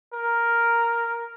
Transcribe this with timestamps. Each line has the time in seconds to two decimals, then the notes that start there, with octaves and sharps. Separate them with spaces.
0.13 A#4